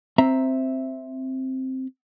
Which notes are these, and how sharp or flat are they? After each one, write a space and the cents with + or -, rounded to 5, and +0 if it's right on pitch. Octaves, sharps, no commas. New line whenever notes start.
C4 +5 E5 +0 A#5 +0